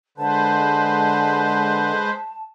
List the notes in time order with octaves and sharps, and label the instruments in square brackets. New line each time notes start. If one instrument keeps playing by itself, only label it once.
[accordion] D3 [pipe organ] G#3 B4 C5 [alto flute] A5